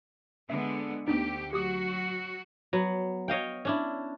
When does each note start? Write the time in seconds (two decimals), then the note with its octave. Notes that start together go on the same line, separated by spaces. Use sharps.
0.50 D3 G#3 B3 E5
1.08 D2 B3 D4 D#4 G4
1.53 F#3 F#4 G4 D6 D#6
2.73 F#3 B3
3.28 C#5 D#5 F5 G5
3.65 C#4 D4 E4